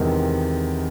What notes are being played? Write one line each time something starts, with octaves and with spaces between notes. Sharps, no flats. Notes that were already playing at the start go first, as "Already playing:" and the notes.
Already playing: E2 C3 D#3 G#3 C4